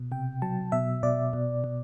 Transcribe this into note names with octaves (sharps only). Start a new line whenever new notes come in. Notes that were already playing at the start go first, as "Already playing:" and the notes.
Already playing: B2
C3 G5
F#3 A5
B2 E5
B2 D5
B2
B2